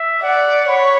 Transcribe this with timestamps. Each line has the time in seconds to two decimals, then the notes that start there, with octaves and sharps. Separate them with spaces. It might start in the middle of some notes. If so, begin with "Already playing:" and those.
Already playing: E5
0.22 D5 F#5
0.68 C#5 B5